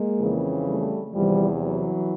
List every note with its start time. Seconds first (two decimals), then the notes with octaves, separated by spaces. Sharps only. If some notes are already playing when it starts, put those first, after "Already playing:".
Already playing: G#3 A#3
0.19 F2 C#3 E3
0.67 G3 A3
1.14 E2 C3 E3 F3 G3
1.61 E3 F#3